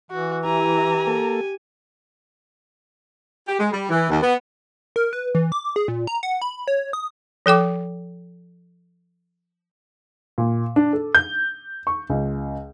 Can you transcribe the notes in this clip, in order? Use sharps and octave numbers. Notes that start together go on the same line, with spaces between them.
E3 F#4
E4 G4 G#5 A#5
A#3 A4
G4
G#3
G3
E3
D#2
B3
A#4
B4
E3
D6
G#4
A#2
A#5
F#5
B5
C#5
D#6
F3 A4 G5 D6
A#2
D4
A4
G6
C#6
C#2